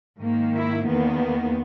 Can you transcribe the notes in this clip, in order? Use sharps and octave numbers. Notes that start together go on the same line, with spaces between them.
G#2 D#3 A#3
E4
E2 D#3 A#3 B3